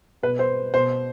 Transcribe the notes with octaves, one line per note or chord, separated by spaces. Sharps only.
B2 B4
C5
B2 C5